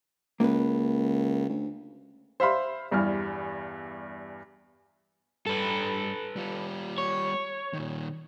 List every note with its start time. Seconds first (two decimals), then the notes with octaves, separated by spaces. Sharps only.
0.40 C#2 A#3 B4
1.49 D2
2.40 C5 E5 F5 B5 C6
2.91 E2 G2 E3 G3 F6
5.46 G2 A4 B4
6.36 G3 F4
6.98 C#5
7.74 A#2 D#3